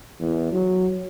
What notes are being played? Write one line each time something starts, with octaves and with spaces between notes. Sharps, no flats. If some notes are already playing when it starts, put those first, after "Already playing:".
E2
F#3